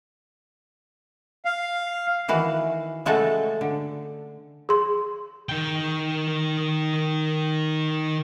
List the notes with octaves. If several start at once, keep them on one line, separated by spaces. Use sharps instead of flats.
F5
D#3 E3 F#4 F5
C#3 G#3 A3 F#4 A4 A5
D3
G#4 C6
D#3 G5